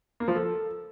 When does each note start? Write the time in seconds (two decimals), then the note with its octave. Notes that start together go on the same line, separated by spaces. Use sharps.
0.20 A#3
0.28 F3
0.35 A4